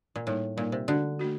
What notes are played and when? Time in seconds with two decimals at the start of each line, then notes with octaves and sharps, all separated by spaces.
0.16 A#2
0.27 A2 G3 A#3 D#4
0.57 A#2 G3 A#3 D#4
0.72 C3
0.88 D3 A3 D4 F#4
1.20 A3 D4 F#4